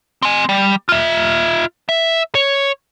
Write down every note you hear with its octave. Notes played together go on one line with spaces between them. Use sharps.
C4 G#5
G3
F4 E5
E5
C#5